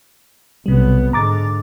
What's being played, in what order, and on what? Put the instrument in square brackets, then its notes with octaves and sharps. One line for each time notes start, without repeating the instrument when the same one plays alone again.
[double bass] B1 B3 [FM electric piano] C3 G3
[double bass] G#2 D3 [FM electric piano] A#5 D6 A6